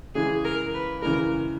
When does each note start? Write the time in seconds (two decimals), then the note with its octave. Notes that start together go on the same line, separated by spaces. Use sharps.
0.15 C#3 E3 G#3 G#4
0.45 A#4
0.74 B4
1.02 C#3 E3 G#3 A#4